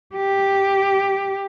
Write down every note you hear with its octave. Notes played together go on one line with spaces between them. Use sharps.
G4